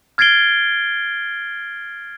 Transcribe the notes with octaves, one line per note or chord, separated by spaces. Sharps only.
F6 G#6 A6 C7 D7 G7